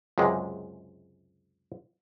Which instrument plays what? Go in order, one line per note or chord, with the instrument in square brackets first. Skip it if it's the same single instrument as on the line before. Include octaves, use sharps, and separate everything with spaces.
[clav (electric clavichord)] C#2 F#2 C3 G#3